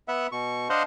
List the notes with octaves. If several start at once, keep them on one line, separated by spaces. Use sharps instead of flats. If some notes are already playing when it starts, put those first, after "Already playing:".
B3 E5 F#5
B2 C#6
D4 C5 D#5 F5 F#5 C6